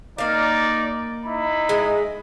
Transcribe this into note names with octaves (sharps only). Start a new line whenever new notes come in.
A#3 D#4 D5 F5
D#4 E4 B5
G#3